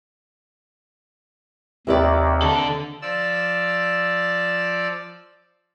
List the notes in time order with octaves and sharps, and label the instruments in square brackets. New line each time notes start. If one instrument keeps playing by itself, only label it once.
[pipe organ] D#2 [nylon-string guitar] C3 B4 D5
[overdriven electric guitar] D3 A4
[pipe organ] F3 D5 E6